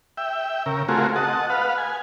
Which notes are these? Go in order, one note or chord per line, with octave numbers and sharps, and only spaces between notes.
E5 G5
C#3 A#4
A3 C4 F4 F#4 G#4 A#4
D#5 F#5 A5
B4 F5 F#5
G#5